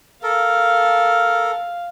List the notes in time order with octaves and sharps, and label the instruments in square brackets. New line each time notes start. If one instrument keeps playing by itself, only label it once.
[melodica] A4 A#4 [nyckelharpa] F5